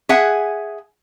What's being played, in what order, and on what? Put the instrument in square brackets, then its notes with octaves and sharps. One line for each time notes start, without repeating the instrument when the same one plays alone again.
[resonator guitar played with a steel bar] G#4 E5 F#5 G#5